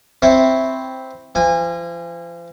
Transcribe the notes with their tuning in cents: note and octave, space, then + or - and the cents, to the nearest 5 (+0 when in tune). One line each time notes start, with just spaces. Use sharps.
C4 +0 E4 +0 C#5 +0
F3 -40 G#5 -30